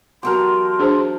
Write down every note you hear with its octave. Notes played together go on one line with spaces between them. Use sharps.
E2 F#3 G4 A4 A#4 A#5 C6
D4 G#4 C5